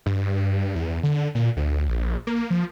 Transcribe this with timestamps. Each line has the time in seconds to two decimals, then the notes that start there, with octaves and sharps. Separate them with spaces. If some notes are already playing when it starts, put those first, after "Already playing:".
0.06 G2
0.75 E2
1.03 D3
1.35 A#2
1.57 D2
1.89 A#1
2.27 A#3
2.50 F3